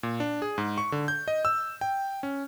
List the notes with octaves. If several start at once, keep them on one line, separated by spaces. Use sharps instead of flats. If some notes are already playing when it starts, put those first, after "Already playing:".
A#2
D4
G#4
G#2
C#6
D3
G6
D#5
E6
G5
C#4